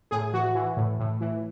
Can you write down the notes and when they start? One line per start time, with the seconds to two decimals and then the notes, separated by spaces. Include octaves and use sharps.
0.11 A2 G#4
0.33 E3 F#4
0.55 E3
0.77 A2
0.99 A2
1.21 E3